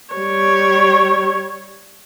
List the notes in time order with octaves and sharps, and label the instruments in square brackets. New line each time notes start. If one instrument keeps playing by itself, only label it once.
[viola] G3 C#5